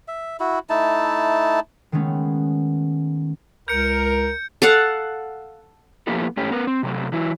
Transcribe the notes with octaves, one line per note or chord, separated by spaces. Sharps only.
E5
E4 F#4
A3 D#4 E4 A5
D#3 G#3 A3 B3 C#4
C#2 A#4 G6 C#7
A4 F5 F#5
F3 A#3 B3 E4 G4 A4
G#2 A3 C#4 G4
B3 A#4 B4
C4
C3 F#3 A3
E3 F#3 E4